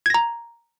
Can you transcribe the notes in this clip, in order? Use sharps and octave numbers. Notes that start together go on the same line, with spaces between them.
A#5 G#6 A#6